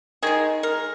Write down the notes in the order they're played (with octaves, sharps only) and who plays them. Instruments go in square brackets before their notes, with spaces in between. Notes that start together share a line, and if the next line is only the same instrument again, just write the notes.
[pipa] D#3 G#3 G#4
A#4